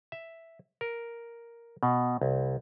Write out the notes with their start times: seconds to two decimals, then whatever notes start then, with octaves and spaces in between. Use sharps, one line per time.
0.12 E5
0.81 A#4
1.83 B2
2.22 C2